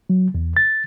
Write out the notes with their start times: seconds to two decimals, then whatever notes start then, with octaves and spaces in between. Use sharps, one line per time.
0.10 F#3
0.35 E2
0.57 A6